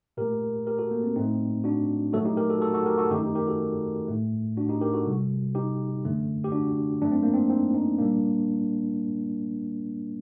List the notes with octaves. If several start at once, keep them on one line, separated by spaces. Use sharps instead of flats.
A#2 A3 G4 A#4
G4 A#4
F#4 A4
A#3
C4
A2 A3 C4 D#4
D4 F#4
A#2 F#3 A3 F#4 A4
D#4 G4
G4 A#4
F#4 A4
F#4 A4
F#4 A4
G4 A#4
F#4 A4
F#2 D#3 A3 D#4 G4
D#4 G4
G4 A#4
F#4 A4
A2 A3
D4 F#4
D#4 G4
G4 A#4
F#4 A4
C3 G3
D#4 G4
F#2 D3 A3
G4
D4 F#4
F#2 F#3 A3 D4
C4
A#3
C4
C4 D#4
C4 D#4
A#2 G3 A#3 D4